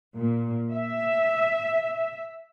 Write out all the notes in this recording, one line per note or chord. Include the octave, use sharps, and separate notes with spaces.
A#2
E5